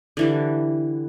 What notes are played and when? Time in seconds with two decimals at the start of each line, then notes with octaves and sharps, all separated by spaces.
0.17 D3 E3 G3